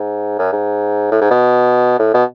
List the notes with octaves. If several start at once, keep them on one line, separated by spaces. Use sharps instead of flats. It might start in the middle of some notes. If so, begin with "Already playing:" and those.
Already playing: G#2
F#2
G#2
A2
G#2
B2
A2
B2